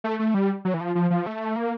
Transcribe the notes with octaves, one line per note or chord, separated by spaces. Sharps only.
A3
A3
G3
F#3
E3
F3
F3
F3
A3
A#3